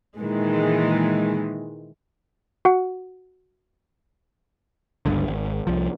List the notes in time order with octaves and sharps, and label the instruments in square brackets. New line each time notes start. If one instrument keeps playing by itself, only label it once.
[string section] A#2 D#3 E3 G#3
[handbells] F#4 F#5
[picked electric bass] G1 C#2 G2 D3
G#1
C2 F3